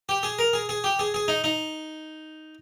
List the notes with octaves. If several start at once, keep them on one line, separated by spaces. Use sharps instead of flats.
G4
G#4
A#4
G#4
G#4
G4
G#4
G#4
D#4
D#4